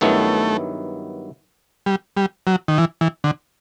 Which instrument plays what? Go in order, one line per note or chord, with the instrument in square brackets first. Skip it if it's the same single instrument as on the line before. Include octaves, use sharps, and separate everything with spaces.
[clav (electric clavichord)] G2 D#3 F#3 B3 E4 [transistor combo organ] A3
[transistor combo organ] G3
G3
F#3
D#3
E3
E3
D3